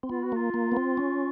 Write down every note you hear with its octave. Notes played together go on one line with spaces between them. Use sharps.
C4
B3 F4
F#4
A#3 F4
A#3
B3
C4
C#4